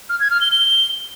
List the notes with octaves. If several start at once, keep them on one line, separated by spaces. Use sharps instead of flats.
F6
G#6
F6
G7
G7